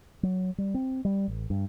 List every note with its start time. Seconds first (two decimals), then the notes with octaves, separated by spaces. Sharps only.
0.23 F#3
0.58 G3
0.74 C4
1.05 G3
1.28 A1
1.50 G2